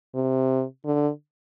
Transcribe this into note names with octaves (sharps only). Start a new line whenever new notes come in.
C3
D3